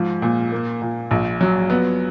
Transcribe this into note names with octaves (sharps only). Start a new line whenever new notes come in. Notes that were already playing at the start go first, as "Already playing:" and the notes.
Already playing: G#2 F3
A#2
A#3
A#2
A#1
F#3
B3